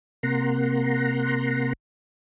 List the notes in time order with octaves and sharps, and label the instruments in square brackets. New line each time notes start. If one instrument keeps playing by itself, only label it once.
[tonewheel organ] C3 A#3 F#5 A#5 C6